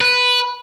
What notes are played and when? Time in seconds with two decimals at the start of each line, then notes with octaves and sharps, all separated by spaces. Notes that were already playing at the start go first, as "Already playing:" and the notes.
0.01 B4